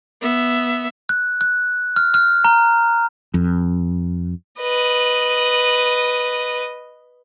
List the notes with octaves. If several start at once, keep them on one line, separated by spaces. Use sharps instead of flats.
B3 E5
F#6
F#6
F6
F6
A#5
F2
B4 D#5